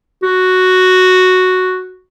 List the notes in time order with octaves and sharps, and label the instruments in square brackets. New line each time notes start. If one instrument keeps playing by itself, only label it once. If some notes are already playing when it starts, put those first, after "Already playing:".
[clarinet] F#4